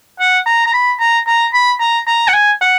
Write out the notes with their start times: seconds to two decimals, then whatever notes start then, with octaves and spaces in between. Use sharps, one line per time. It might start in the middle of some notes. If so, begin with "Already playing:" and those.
0.20 F#5
0.46 A#5
0.66 A#5
0.74 B5
1.00 A#5
1.27 A#5
1.54 B5
1.80 A#5
2.07 A#5
2.28 F#5
2.33 G#5
2.61 F#5